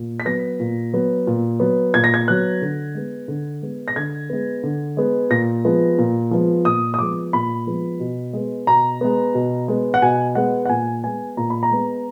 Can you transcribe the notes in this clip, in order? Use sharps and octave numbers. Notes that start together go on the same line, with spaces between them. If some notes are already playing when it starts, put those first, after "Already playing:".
Already playing: A#2
B6
F#3 B3 A#6
A#2
F#3 B3
A#2
F#3 B3
A#2 G#6
A#6
G#6
F#3 B3 F#6
D3
G#3 B3
D3
G#3 B3
A#6
D3 G#6
G#3 B3
D3
G#3 B3
A#2 A#6
F3 G#3 B3
A#2
F3 G#3 B3
A#2 D#6
D#6
F3 G#3 B3 D6
A#2 B5
F3 G#3 B3
B2
G#3 B3
B2 A#5
G#3 B3
B2
G#3 B3
F#5
B2 G#5
G#3 B3 F#5
F#5
A#2 G#5
G#3 B3 G#5
A#2 A#5
B5
A#5
G#3 B3